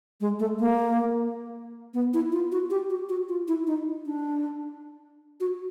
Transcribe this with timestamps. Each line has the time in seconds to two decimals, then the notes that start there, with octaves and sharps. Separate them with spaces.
0.21 G#3
0.39 A3
0.60 A#3
1.94 B3
2.14 E4
2.32 F4
2.52 F#4
2.70 G4
2.90 F#4
3.09 F#4
3.29 F4
3.48 E4
3.67 D#4
4.06 D4
5.40 F#4